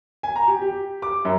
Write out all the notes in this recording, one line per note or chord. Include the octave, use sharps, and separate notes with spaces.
G#5
A#5
G4
G4
D6
F#2